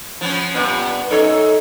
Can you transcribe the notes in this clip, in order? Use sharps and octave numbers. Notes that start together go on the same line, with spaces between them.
F3 B3 C#4
G2 A#2 B3
F#2 D#4 A4 C#5